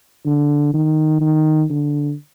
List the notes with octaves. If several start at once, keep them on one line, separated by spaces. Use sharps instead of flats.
D3
D#3
D#3
D3